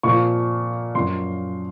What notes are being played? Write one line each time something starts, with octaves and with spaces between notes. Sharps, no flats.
A#2 F3 C#6
F#2 F3 C6